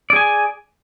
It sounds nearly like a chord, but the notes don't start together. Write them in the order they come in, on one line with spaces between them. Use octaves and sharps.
D5 G#4 G#5